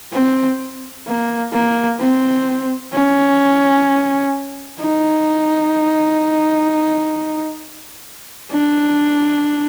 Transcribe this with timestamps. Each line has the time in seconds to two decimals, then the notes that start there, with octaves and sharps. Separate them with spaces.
0.13 C4
1.07 A#3
1.53 A#3
2.00 C4
2.94 C#4
4.80 D#4
8.52 D4